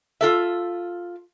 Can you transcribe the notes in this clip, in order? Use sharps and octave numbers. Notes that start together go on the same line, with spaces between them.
F4 A4 E5